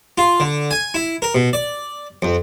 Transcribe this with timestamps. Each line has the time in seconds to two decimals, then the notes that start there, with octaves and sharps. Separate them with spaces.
0.18 F4
0.40 D3
0.71 G#5
0.94 E4
1.22 A#4
1.35 B2
1.53 D5
2.22 F2